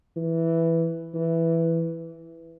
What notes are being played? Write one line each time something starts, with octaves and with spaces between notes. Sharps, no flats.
E3
E3